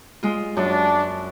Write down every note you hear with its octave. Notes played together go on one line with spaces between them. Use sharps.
G#3 F4
F#2 D4